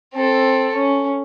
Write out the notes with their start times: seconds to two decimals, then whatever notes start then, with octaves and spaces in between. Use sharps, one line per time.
0.15 C4 A4
0.75 C#4